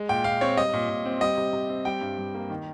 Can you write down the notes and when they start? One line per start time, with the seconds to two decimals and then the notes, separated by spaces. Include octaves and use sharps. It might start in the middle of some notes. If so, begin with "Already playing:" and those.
Already playing: G#3
0.09 A#2 G5
0.24 A#2 F5
0.41 C4 C#5
0.57 G3 D#5
0.73 A#2
0.89 A#2
1.05 C4
1.21 G3 D#5
1.37 C3
1.53 C3
1.69 C4
1.85 G3 G5
2.01 G2
2.18 G2
2.34 A#3
2.50 D#3